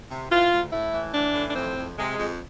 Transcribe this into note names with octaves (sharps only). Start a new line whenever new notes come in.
C3
E3 F4
D2
A2 E4
E3
E3 D4
A2
D4
F2 C4
F2
C3 G#3
F2